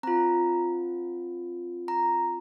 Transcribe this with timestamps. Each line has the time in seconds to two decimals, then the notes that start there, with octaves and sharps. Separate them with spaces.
0.03 C4 F4 A#5
1.88 A#5